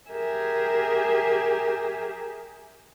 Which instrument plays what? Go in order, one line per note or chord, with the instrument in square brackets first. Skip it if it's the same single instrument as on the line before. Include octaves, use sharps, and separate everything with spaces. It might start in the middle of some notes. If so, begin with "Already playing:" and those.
[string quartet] G4 G#4 A#4 E5 G#5